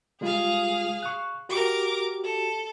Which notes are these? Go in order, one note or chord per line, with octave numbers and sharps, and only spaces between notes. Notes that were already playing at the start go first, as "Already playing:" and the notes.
G3 G#3 F4 G#4 F5
C#6 F#6
F#4 G4 A#4 D6
A4